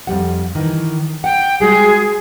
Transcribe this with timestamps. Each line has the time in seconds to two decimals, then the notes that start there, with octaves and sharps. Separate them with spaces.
0.07 F2 G3 F#5
0.55 D#3 E3
1.24 F#5 G5
1.60 G3 G#3 F#4 G#4